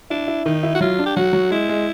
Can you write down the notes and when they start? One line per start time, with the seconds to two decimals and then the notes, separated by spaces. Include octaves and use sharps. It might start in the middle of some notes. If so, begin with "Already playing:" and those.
0.10 D4 E4
0.28 E4
0.45 D#3 D#4
0.63 E4
0.75 F#4
0.81 F#3 F4
0.99 D4
1.06 G4
1.16 F#3 F#4
1.33 F#3
1.51 G#3 E4
1.69 G#3